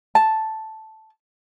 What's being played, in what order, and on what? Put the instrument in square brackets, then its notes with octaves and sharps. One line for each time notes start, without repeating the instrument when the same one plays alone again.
[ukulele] A5